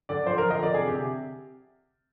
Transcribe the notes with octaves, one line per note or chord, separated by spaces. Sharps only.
D3 D5
F3 C5
A#4
F3
D#5
D3 D5
C3 G#4
C3 G4